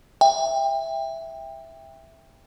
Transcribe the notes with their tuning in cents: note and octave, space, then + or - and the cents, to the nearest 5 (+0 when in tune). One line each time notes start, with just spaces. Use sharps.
E5 +0 G5 +20